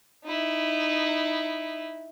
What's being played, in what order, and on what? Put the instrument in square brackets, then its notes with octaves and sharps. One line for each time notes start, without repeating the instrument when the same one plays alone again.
[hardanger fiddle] D#4 E4